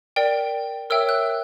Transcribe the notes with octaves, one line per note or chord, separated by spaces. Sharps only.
A#4 D5 G5
A#4 C#5 E5 G5 E6
F#6